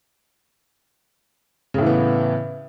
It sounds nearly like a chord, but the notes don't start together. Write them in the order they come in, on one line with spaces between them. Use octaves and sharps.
C#3 A2 E3 B3